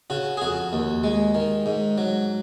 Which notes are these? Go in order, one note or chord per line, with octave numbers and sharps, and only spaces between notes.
C#3 F#4
G#4
F2 F#4
D#2
G#3
D#3
G#2
F#3